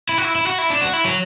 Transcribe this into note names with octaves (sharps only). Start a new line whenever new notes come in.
E4
F#4
E4
E4
F#4
E4
D4
F#4
E4
F#3